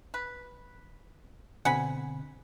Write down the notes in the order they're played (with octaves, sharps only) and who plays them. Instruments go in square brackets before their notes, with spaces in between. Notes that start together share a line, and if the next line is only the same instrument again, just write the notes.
[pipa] B4
[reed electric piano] B2 D3 C4 [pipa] F#5 G#5 B5